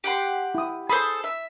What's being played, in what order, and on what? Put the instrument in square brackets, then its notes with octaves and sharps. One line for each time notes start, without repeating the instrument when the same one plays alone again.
[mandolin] G4 F#5 C6
[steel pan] E4 D#6
[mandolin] G#4 A4 C5 [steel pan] B5
[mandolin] E5